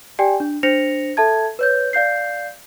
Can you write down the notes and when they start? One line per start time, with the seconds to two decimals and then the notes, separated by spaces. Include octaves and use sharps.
0.19 G4 D5 G5 G#5
0.40 D4
0.63 D4 C5 A#6 C#7 F7
1.17 A4 E5 A5 G#6
1.59 B4 C#5 G6
1.93 D5 F5 G6 C7